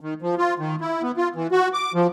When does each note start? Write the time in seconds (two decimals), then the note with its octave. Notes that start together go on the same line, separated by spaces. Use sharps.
0.01 D#3
0.22 F3
0.38 F4
0.59 D#3
0.81 E4
1.03 B3
1.17 F4
1.36 E3
1.52 F#4
1.73 D6
1.94 F3